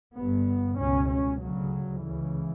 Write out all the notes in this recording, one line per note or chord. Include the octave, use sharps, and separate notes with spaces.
G1 G2 B3
C#2 B2 C#4
C#4
D2 C#3 F#3
C#2 C#3 E3